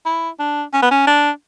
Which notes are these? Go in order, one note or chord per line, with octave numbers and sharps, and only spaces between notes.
E4
D4
C#4
B3
C#4
D4